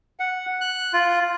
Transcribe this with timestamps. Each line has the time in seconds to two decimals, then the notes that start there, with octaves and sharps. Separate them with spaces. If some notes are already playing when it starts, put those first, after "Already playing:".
0.20 F#5
0.61 F#6
0.93 F4